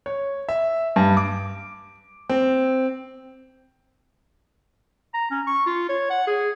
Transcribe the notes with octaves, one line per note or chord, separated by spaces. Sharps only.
C#5
E5
G2
D6
C4
A#5
C#4
C#6
F4
C#5
F#5
G#4